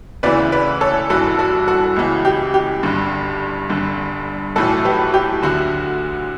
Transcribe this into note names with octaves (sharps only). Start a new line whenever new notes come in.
D2 C#3 E3 B4 D5
B4 D5
A4 C#5
G1 G2 E3 F#4 A4
F#4 A4
F#4 A4
C#2 C#3 E3
G4
G4
G1 G2 D3
G1 G2 D3
B1 A2 E3 F#4 A4
G4 B4
G4
D2 D3 F#4